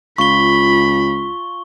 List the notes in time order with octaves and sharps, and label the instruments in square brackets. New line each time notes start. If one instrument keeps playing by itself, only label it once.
[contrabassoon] C#2 [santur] F4 [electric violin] B5 [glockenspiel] C#6 G7